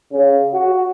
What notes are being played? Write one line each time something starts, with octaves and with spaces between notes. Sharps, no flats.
C#3
F#4